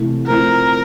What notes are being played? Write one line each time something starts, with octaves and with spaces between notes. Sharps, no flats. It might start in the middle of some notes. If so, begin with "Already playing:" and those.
Already playing: C3 E3 A3
F3 A3 C4 E4 A#4